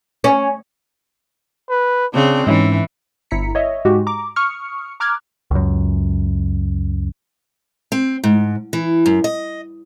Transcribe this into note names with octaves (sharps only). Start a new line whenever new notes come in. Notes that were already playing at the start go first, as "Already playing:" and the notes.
C#4
B4
C#3 C4 D4
G#2 E3 C#4 D#4 E5
G1 E4 A#5 B6 C#7
C#5 D#5 E5
G#2 G#3 F#4 G4
A#5 D6
C#6 D#6 F6 C#7
A#5 D6 F6 F#6 G#6
C#2 F#2
C4
G#2
E3
F#2
D#5